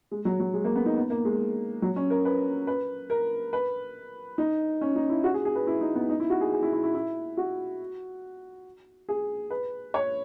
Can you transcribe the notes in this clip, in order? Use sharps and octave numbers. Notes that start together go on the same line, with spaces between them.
G#3
F#3
F#3
G#3
A#3
B3
D#4
B3
A#3
G#3
F#3
C#4
A#4
B4
B4
A#4
B4
D#4
C#4
D#4
E4
F#4
G#4
G#4
B4
E4
D#4
B3
D#4
E4
F#4
G#4
G#4
E4
E4
E4
E4
F#4
G#4
B4
C#5